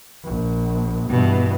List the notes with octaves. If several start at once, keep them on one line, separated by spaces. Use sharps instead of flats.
A#1
G2 B2 E3